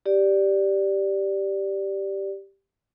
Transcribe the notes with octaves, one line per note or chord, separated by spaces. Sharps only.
G4 D5